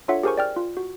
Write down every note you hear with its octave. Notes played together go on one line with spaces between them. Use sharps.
D4 F4 A4 C#5 E5 F#5
G4 G#4 A#4 C5 G#5 C#6
D5 G5 F6
F4
F#4